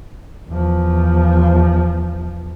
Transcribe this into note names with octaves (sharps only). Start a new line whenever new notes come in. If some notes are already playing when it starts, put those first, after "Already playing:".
E2 F3